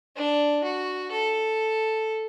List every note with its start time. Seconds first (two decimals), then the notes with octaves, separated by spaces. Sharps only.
0.16 D4
0.64 F#4
1.12 A4